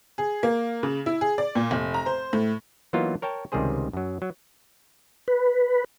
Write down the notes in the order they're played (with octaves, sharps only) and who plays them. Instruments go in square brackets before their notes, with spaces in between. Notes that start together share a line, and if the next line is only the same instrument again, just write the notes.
[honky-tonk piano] G#4
A#3
C#3
E4
G#4
D5
A#2
F1
A#5
C5
A2
[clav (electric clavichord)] E3 F#3 A#3 B3 D#4 F4
A#4 C#5 G5 A5
C#2 C3 D#3 G3 G#4 C5
F#2 F#3
F#3
[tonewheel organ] B4